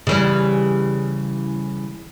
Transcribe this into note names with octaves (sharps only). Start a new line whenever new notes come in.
C#3 E3 G3